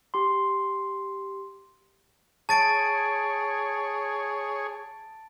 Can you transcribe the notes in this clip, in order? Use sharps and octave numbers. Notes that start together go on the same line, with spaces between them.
G4 C6
G#4 C#5 A5 A6 D7